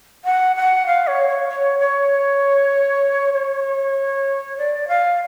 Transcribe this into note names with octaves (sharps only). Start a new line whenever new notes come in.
F#5
F#5
F5
C#5
C#5
C#5
C#5
C#5
D5
F5